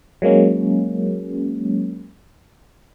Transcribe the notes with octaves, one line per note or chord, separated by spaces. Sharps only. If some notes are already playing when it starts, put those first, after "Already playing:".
F#3 G#3 A#3 C#4